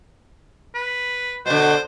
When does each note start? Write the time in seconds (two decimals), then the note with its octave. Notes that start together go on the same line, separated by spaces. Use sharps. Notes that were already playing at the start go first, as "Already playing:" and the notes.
0.75 B4
1.46 B2 D3 C5